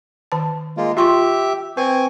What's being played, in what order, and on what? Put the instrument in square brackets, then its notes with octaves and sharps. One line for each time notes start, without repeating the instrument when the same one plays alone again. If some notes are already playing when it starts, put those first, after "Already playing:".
[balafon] D#3 A5
[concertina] G#3 A#3 F4
[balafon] F4 C6 C#6 [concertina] G4 E5
[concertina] C4 G#5 C#6 [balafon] B4